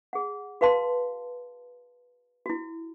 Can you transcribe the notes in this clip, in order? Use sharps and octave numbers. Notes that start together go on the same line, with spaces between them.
G#4 F#5
F#4 B4 F5 A5 C6
E4 F#4